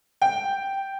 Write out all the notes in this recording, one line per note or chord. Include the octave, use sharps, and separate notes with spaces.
G5